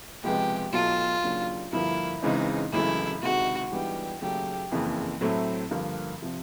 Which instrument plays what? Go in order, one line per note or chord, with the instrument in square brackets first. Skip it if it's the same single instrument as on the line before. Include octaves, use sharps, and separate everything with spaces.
[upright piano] C#2 C3 F3 G#3 B3 [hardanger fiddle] G4
[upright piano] B1 B2 F#3 A3 [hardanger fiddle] F4
[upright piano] D#2 C#3 F#3 A#3 D4
[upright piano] G2 D3 F3 A#3 [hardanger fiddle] E4
[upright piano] C#2 C#3 E3 G#3 C4 [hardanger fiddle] D#4
[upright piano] G#1 F#2 C#3 E3 A3 [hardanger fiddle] E4
[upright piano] C#2 C3 D#3 G#3 [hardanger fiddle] F#4
[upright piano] G#2 E3 G3 B3 D4 [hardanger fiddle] G4
[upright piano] D#2 C#3 F#3 A3 [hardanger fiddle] G4
[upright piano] F#1 F2 C#3 E3
A2 F#3 A3 C4 E4
G2 D3 F3 A#3
C3 F3